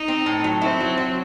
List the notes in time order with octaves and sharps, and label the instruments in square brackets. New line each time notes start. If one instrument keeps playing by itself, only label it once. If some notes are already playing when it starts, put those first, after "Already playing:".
Already playing: [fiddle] D#4
[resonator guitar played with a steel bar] C4
A2
F#3
[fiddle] C4 [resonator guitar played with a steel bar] E4
[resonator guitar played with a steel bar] F#3
F#3